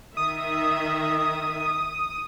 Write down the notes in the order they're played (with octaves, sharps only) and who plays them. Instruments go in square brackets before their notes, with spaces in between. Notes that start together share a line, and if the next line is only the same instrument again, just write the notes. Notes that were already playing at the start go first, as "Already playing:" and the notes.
[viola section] D#3 E5 [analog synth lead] D#6